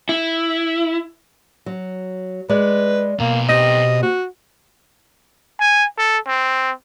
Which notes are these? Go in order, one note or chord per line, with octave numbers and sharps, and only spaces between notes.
E4
F#3
G#3 B4 D5
B2 A#3 A#5
C4 G4 D#5
F#4
G#5
A4
C4